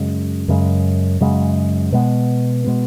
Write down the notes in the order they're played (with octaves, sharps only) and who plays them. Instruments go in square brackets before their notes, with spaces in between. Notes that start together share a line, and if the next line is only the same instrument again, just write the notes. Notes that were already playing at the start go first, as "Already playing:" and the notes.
Already playing: [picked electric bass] F#2 C#3 G#3
F#2 C#3 G#3
F#2 C#3 G#3
B2 G#3 B3
B2 G#3 B3